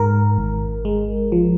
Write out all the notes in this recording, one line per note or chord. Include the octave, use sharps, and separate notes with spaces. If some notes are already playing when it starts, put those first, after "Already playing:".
Already playing: G#2 A#4
G#1
G#3
F3